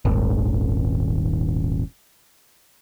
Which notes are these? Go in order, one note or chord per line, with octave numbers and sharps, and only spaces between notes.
D#1 G#1